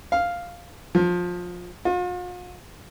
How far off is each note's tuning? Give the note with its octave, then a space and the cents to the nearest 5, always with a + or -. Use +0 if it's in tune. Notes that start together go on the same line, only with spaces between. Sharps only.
F5 +0
F3 +20
F4 +45